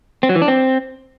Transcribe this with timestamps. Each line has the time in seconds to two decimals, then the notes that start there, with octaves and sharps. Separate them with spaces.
0.23 C4
0.29 F#3
0.36 E3
0.42 D4
0.48 C4